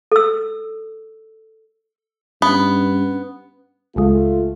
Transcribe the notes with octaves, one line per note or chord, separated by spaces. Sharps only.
A4 E6
G2 B3 C#4
C#2 C#3 G#3 A3 F4